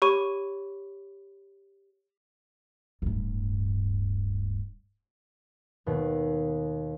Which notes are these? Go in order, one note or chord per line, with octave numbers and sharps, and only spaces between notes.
G4 C#5 B5 C#6 D#7
D1 G2
D#2 B2